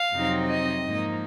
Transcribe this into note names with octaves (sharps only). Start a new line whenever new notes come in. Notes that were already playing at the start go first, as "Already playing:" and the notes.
Already playing: F5
F2 C3 F#3 C4 D#4
D#5
G#2 F3 A#3 D#4